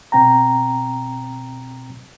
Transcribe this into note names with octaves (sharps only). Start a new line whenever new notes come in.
B2 C4 G5 A#5